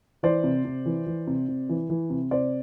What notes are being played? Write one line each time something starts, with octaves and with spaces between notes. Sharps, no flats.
E3 C5 D5
C3
C3
E3
E3
C3
C3
E3
E3
C3
C3 C5 D5